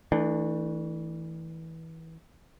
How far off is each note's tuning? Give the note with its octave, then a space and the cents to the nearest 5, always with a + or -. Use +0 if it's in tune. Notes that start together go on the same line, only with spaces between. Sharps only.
E3 -25 A3 +10 D4 +15